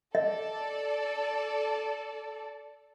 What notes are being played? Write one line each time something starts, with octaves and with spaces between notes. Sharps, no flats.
A4 D5 D#5